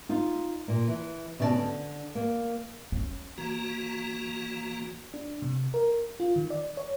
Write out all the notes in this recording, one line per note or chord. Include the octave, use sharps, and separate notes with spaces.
D#4 F4
A#2
E3
D2 B2 C#4 D4 D5 A5
D3
A#3
C#4
E3 A#3 F#4 A#5
D4
C3
A#4
F4
D#3
D5
C#5